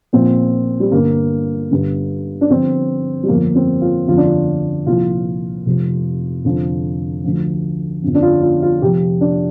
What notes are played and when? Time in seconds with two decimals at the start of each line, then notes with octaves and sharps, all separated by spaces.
0.13 A#1 A#2 F3 C4
0.80 G3
0.92 G1 G2 D3 A#3
1.71 G1 G2 D3
2.41 D4
2.50 G1 G2 F3 C4
3.23 G3
3.28 G1 F2 F3 A#3
3.55 C4
3.81 F4
4.07 G1 F2 D3 F3 F4
4.17 D4
4.26 F4
4.86 C2 A#2 F3 F4
5.66 F1 F2 C3
6.45 F1 F2 D3 F3
7.24 D2 D3 F3
8.02 G1 F2 D3 F3
8.15 D4
8.22 F4
8.43 F4
8.62 F4
8.81 F1 F2 F3 G4
9.21 D4